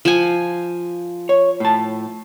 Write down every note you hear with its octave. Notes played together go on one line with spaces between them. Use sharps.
F3 G#5
C#5
A2 A5